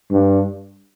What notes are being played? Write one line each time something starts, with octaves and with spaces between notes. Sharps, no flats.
G2